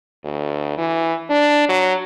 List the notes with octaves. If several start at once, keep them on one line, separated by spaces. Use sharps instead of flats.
D2
E3
D4
F#3